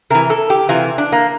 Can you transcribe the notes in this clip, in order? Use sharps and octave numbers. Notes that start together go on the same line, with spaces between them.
C3 E3 A#4
A4
G4
C3 E3 F4
D4
A#3